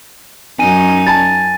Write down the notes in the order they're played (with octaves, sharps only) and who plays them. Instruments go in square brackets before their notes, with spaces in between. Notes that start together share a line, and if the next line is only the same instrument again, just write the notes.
[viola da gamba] F#2 C#4 D#4 [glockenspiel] G#5 D#7
[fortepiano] G#5 A5 [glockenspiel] A6